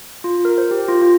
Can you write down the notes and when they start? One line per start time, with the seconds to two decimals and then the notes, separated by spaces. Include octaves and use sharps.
0.24 F4
0.45 A#4
0.58 C5
0.71 G4
0.88 F4
1.02 F4